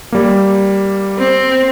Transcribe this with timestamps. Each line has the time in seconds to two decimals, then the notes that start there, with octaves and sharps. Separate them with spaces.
0.12 G3 A#3
1.18 C4